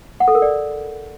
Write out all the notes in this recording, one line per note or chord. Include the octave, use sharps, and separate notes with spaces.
F#5
A4
A#4
D5